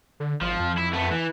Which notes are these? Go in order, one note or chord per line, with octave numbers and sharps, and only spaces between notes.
D3
G#1 F3
F2
E4
A3 B3
E3